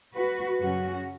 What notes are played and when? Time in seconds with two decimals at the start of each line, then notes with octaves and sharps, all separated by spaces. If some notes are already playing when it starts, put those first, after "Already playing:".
0.14 F#4 B4
0.60 F#2 C#3 F#3 C#4 F#4